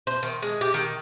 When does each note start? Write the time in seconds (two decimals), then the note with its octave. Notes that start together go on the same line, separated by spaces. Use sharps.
0.07 C5
0.23 D#3
0.42 G#3
0.61 G4
0.74 D#3